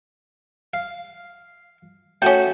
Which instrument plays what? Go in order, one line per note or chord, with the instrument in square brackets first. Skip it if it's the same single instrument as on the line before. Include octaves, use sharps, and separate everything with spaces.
[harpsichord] F5
[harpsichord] A3 F#4 [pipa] C#4 G5